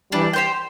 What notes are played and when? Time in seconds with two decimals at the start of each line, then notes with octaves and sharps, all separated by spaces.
0.12 E3 G3 D4
0.33 G4 C5 G5